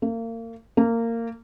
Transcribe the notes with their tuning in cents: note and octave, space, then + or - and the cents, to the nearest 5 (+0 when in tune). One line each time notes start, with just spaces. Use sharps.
A#3 -35
A#3 -20